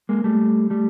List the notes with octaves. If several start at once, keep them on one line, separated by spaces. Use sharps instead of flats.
G#3 A#3
G3 A3
G3 A3